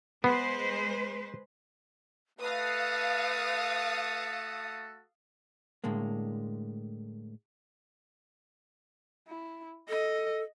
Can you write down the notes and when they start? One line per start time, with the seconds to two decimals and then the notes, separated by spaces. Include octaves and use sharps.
0.24 G#3 B3 B4 C5
2.39 A3 F#4 A4 B4 F5 D#6
5.84 A2 D3 G#3 A#3
9.28 E4
9.89 A4 D#5